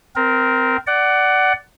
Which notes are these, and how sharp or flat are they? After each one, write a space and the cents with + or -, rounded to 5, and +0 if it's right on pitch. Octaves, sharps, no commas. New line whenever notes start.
C4 -15 A#4 +5
D5 +0 F#5 +20